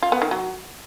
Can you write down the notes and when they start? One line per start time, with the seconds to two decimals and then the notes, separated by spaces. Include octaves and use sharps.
0.03 F4
0.12 B3
0.22 D#3
0.31 F#3